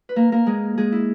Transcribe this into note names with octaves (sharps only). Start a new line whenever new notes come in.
B4
A#3 A#4
A#3 A#4
G#3 G#4
G#3 G#4
E4